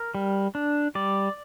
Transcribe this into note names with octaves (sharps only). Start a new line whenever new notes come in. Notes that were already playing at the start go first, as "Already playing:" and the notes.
Already playing: A#4
G3
D4
G3 D5